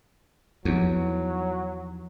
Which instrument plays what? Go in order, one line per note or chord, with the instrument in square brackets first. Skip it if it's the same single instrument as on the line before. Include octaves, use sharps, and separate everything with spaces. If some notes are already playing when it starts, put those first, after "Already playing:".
[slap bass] E2 [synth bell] F3 D#4 G4 [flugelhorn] F#3